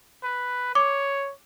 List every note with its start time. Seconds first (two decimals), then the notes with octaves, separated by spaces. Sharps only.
0.24 B4
0.75 C#5 D6